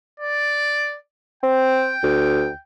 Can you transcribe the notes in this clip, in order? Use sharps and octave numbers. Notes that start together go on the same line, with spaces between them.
D5
C4 G5
D2